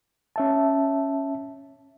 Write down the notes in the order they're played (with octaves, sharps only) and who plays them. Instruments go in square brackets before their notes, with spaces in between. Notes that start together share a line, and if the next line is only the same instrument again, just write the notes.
[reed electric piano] C#4 E5 A5